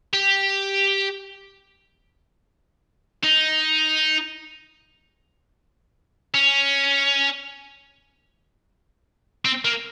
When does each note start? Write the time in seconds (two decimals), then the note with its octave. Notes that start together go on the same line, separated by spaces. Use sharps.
0.13 G4
3.24 D#4
6.34 C#4
9.45 C4
9.65 A#3